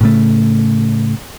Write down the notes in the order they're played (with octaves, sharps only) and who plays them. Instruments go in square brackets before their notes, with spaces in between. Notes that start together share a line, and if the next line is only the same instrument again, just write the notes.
[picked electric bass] A2 C#3 A3